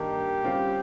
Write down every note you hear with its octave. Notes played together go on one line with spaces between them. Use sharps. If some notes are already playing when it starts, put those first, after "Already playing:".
Already playing: G2 D#3 A#3 D#4 G4
C#3 G3 C4 F4